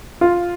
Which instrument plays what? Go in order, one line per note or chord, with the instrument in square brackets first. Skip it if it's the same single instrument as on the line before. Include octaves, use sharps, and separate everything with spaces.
[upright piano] F4